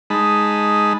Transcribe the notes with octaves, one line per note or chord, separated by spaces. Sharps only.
G#3 D#4 A5 B5